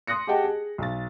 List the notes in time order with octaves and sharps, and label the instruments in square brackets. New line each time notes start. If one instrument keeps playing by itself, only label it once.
[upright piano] C6 D#6 F#6 A#6 C#7
G4 G#4 D#5 F#5 G5 A5
G#4
B1 A6